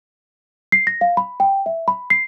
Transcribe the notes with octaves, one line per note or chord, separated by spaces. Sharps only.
C7
A#6
F5
B5
G5
E5
B5
C7